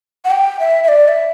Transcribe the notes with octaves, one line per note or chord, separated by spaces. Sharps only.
F#5
G5
E5
E5
D5
E5